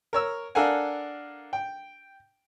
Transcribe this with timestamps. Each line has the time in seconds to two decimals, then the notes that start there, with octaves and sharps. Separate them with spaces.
0.13 A#4 C#5 E6
0.55 D4 A4 A#4 F5 F#5 G#5
1.53 G5